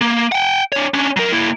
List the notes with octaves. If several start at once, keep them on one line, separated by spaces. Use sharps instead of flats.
A#3
F#5 G5
D4 C#5
C#4 D4
F#3 A#4
A#3 E4